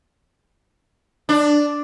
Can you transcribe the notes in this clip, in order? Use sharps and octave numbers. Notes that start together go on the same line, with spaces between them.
D4